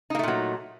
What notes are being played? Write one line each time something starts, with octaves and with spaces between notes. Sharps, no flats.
A#2 F#3 A3 A#3 D#4